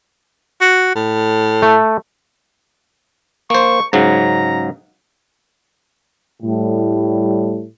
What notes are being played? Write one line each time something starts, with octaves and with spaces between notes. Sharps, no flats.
F#4
A2
A3
A#3 C5 C#6
G#2 C#3 F#3 A#5
A2 G3